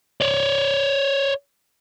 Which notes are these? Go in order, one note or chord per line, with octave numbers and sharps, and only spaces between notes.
C#5 D5